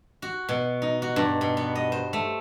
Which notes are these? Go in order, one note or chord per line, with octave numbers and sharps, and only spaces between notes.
F#4
B2
D#4
F#4
G2
B2
B3
D#5
C5
A3